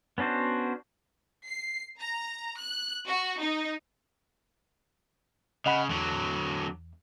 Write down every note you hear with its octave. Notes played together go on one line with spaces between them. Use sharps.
B3 C#4 D4 F#4 C5
C7
A#5
F#6
F#4
D#4
C#3 D#5 F#5 B5
E2 D3 F#3